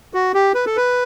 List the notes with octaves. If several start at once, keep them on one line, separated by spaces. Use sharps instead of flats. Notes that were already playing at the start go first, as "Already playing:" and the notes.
F#4
G4
B4
A4
B4